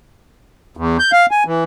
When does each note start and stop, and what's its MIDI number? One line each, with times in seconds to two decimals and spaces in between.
0.77 0.97 40
0.99 1.11 91
1.12 1.26 77
1.31 1.44 80
1.46 1.64 52